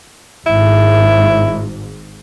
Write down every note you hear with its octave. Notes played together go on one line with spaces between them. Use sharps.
G#1 G#2 E4